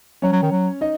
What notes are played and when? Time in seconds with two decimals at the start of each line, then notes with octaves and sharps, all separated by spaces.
0.22 F#3 C#4 C#5
0.32 F#3
0.42 D#3
0.51 F#3
0.81 D#4 D#5